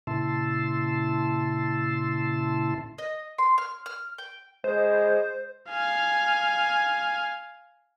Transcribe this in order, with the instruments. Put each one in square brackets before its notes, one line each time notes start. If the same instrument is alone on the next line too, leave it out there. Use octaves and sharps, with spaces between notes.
[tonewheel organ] A#2 C#3 E4 A5 C6 E6
[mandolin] D#5
C6
F6
F6
G5
[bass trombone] G#3 [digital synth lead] C5
[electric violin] F5 G#5